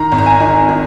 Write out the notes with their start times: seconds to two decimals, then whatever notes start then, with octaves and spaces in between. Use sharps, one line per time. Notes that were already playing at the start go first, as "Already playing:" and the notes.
Already playing: D#3 A#5
0.12 G#1
0.18 A#5
0.26 G#5
0.40 D#3
0.69 D#3